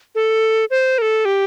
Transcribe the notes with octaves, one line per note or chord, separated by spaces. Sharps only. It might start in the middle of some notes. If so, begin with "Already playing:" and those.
A4
C5
A#4
A4
G4